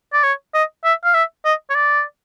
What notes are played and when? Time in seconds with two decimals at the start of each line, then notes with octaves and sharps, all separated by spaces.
0.13 D5
0.24 C#5
0.54 D#5
0.84 E5
1.04 F5
1.14 E5
1.45 D#5
1.70 C#5
1.75 D5